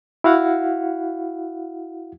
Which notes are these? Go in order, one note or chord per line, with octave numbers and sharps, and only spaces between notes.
E4 F#4 F5 F#5